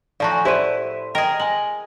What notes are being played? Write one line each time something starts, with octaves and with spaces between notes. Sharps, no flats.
A2 F3 F#4 D5 F5 A5 A#5
G#5
E4 G4 C5 D5 E5 C6 D#7
G#4 A#4 D#5 G5 A#5
G#3 G#5 F#7